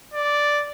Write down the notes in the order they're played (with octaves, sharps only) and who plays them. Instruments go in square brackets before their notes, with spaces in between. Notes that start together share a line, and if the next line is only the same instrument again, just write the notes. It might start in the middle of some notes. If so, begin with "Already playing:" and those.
[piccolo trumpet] D5